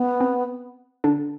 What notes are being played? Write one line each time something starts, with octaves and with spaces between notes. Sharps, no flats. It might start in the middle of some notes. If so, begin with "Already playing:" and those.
Already playing: B3
C4
D3 D4